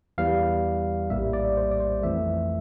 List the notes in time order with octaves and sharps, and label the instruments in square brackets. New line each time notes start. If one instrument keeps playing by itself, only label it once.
[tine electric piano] E2 E3 G3 F5
A#1 A2 G3 A#3 E5
D5
C5
D5
C5
F2 E3 A3 E5